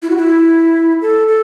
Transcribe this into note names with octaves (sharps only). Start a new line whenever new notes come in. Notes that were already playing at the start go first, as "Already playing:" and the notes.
E4
F#4
E4
A4
A4